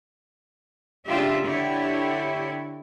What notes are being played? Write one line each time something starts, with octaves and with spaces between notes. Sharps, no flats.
C#3 D4 F4 G4 E5
D3 D4 E4 G4 C#5